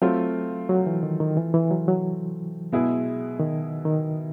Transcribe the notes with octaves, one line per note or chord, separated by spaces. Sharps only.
F#3 A3 C4 F4
F#3
E3
D#3
D#3
E3
E3
F#3
F#3
B2 G#3 B3 E4 G#4
D#3
D#3